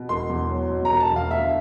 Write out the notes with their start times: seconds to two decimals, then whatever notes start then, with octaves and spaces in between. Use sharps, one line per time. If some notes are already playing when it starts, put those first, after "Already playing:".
Already playing: B2
0.09 E1 C6
0.30 E2
0.50 F#3
0.70 B2
0.85 A#5
0.90 E1
1.00 A5
1.11 E2
1.16 F5
1.31 D2 E5